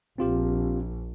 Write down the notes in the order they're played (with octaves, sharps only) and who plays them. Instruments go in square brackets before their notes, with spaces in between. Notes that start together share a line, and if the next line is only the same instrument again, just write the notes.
[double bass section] A#1 [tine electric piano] C4 F4 G4